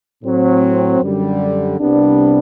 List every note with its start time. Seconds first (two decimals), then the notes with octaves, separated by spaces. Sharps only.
0.23 A2 F#3 C4
1.00 F#2 D3 G3
1.79 C2 C3 G3 B3 D4